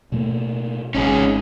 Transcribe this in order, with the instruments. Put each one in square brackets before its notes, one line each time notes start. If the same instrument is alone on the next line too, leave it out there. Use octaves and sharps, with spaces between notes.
[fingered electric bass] B2 A3 A#3
[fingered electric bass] G#1 G#2 [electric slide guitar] C#4 D#4 G#4